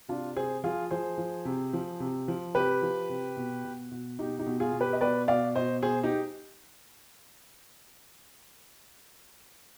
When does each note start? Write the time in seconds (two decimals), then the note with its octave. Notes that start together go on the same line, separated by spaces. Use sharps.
0.08 C3 D4 F4
0.36 C3 G#4 C5
0.64 F3 F4 G#4
0.90 F3 G#4 C5
1.18 F3
1.45 C3
1.73 F3
2.00 C3
2.28 F3
2.55 C3 G4 B4
2.82 F3
3.09 C3
3.37 B2
3.65 B2
3.91 B2
4.19 B2 D#4 G4
4.39 D#4 G4
4.47 B2
4.60 F4 G#4
4.73 B2
4.80 G4 B4
4.93 D#5
5.01 B2 B4 D5
5.28 B2 D5 F5
5.55 B2 C5 D#5
5.82 B2 G#4 C5
6.04 D#4 G4